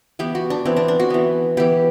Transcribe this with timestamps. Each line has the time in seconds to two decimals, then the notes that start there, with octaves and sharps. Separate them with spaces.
0.19 E3 B3 G4
0.35 F#4
0.50 D4
0.65 E3 B3 C4
0.76 D4
0.88 D4
1.00 F#4
1.10 E3 B3
1.57 E3 B3 G4